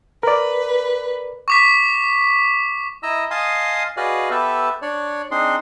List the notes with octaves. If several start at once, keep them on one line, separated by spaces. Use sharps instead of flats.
A#4 B4 D5
C#6 D6 B6
E4 D#5 A#5 E6
D#5 F5 G#5 A5 C6 D#6
F#4 G#4 B4 D5 D#5 F5
B3 G4 A4 B4 E5
D4 C#5 D5
C4 D4 D#4 G#4 C6